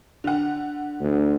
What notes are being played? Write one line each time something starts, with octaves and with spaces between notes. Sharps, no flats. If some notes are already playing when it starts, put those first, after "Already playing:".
D3 F#5
D2